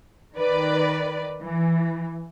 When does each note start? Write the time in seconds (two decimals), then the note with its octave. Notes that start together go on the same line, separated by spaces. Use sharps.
0.35 D#3 B4 D5
1.43 E3